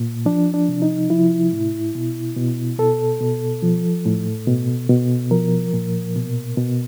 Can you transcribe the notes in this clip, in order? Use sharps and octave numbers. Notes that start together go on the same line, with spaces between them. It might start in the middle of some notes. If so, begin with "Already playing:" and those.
Already playing: A#2
F3 D4
D4
C3
D#4
F3 E4
A2
B2
B2
B2 A4
B2
F3
A2
B2
B2
F3 A#4
A#2
B2
B2